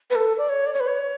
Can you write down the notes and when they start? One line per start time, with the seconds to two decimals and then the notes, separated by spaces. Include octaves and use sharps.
0.10 B4
0.15 A4
0.38 D5
0.49 C#5
0.66 D5
0.73 C#5
0.80 B4
0.87 C#5